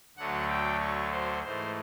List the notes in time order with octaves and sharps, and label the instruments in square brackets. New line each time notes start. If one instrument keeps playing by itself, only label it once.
[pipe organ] D2 D3 F#3 A3 F#5
G5
C#5
C5
G#2 E3 A3 C5